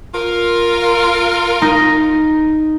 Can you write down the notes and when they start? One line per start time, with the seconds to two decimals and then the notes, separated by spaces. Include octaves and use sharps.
0.13 F4 A#4
1.62 D#4